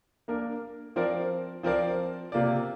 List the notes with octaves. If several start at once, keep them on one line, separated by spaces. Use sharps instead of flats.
A#3 D4 A#4
F3 C4 A#4 D5
F3 C4 A#4 D5
C3 A#3 F4 D5